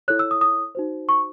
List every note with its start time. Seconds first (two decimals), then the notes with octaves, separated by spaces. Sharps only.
0.08 E4 A4 C#5 F#6
0.19 E6
0.31 D#6
0.41 D#6
0.75 D#4 F#4 C5
1.09 C#6